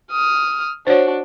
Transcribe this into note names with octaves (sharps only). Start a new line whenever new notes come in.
D#6 F6
D4 F#4 C5 C#5